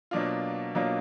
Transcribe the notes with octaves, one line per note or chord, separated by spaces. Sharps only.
B2 F#3 A#3 D4 F4
B2 F#3 A#3 D4 F4